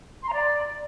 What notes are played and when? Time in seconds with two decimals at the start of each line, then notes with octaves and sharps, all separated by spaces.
0.22 C6
0.27 A#5
0.33 D5